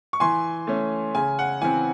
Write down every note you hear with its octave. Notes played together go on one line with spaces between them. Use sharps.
C#6
E3 G#5 C6
A3 C#4
C#3 G#5
F#5
E3 C4 G#5